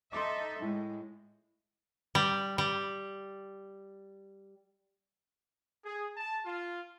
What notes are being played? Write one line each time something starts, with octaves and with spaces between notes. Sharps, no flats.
D#4 A4 E5 C6 D6
A2 G#3
G3
G3
G#4
A5
F4